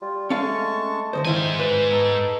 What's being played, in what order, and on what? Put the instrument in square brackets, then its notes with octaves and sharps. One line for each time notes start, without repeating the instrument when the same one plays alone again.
[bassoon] G3 [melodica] F4
[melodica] G#3 A5 C#6 [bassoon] A3 [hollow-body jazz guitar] C#4 F5
[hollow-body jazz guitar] D3 E3 C5 [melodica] D#5
[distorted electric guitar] G#2 G#5 [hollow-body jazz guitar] D#3 E4 F5 [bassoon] D#4 [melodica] C5
[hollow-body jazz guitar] B4
[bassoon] B3 [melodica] D#4 A4